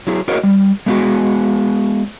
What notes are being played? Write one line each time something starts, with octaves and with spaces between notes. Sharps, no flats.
F#3 E4 G#4
E4 F#4 G#4 A#4 C#5 D#5
G3
G#3 A3 B3 D#4 F#4 G#4